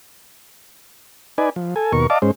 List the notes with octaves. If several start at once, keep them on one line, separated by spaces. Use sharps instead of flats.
D#4 B4 D5 G#5
F3
A4 G#5
D#2 B2 A#4 C#6
D5 D#5 F5 A5 D6
G#2 G#3 C#4 C5